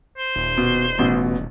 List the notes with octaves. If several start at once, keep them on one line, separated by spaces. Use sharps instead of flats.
C5
D#1
B2
A1 B2